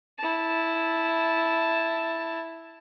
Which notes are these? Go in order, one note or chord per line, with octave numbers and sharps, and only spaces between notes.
E4 A5